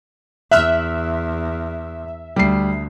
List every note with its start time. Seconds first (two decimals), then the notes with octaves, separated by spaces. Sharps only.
0.51 E2 E5 F6 F#6
2.36 D2 G3 C7